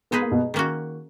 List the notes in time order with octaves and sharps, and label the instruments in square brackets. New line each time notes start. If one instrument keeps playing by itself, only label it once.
[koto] G#3 D#4 G#4 B4 [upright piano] B3
[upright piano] A#3
B2 B3
[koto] D#3 A#3 C#4 F#4